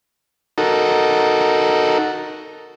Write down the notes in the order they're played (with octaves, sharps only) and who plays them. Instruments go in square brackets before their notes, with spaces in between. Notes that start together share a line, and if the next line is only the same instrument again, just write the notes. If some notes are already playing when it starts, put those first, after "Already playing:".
[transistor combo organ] D#4 F#4 A4 A#4